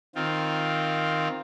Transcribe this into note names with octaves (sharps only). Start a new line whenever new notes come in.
D#3 C4 F4